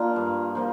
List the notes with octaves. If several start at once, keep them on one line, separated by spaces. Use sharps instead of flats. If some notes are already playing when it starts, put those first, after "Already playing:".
Already playing: A#3 D4 F4
G2
F3 A#3